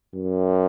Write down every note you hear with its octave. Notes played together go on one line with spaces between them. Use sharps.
F#2